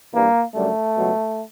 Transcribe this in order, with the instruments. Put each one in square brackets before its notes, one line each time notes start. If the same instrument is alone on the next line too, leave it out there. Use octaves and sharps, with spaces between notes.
[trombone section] G2 E3 G3 A#3
F#2 D3 G3 A3
C#2 B2 F#3